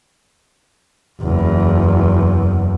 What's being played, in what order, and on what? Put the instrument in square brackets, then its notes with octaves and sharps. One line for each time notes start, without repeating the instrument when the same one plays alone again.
[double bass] F#1 E2